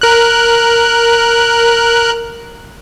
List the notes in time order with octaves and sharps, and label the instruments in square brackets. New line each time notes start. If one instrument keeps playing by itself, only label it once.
[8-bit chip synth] A#4 F#6